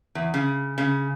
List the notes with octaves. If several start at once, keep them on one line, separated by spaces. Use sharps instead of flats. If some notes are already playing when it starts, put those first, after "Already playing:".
E2
C#3
C#3